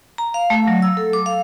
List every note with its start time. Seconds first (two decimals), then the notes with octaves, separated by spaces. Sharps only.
0.18 A#5
0.34 F5
0.50 A3
0.67 F#3
0.82 E6
0.97 A4
1.13 D6
1.26 F5